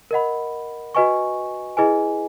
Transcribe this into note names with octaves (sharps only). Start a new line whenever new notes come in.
A#4 D#5 F#5 B5
F#4 B4 D#5 G#5 C#6
E4 G#4 B4 D#5 G#5